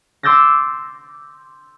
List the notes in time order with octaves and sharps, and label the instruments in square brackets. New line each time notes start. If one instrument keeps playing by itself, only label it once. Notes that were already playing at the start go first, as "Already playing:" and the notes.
[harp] C6 D6 E6 G6 A6 A#6